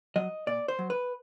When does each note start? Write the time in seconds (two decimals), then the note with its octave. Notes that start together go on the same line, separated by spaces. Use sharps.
0.16 F#3 D#5
0.47 A#2 D5
0.68 C5
0.79 F#3
0.90 B4